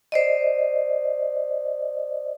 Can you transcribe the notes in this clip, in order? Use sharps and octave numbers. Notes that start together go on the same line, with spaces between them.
C5 D5 D#5